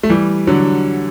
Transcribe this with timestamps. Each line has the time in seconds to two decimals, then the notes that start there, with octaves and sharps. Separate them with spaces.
0.03 A3
0.10 E3 G3
0.47 D3 F#3